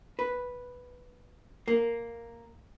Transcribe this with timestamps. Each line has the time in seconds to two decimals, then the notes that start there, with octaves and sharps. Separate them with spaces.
0.19 B4
1.68 A#3